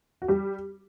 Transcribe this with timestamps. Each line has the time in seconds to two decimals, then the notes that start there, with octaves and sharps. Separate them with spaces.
0.22 F#4
0.28 G3 G4